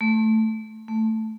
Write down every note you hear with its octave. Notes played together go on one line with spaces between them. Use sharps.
A3
A3